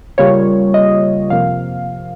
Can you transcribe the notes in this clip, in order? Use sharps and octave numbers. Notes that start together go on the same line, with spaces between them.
C#3 G3 A#3 F4 C#5
D#5
F2 C3 F3 A#3 F5